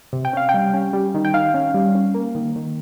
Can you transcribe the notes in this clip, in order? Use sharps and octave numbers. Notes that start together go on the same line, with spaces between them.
C3
G5
C#4 F5
G5
G3
C#4
G3
D#3
G5
D#3 F5
C#4
G3
C#4
A#3
D#3
D#3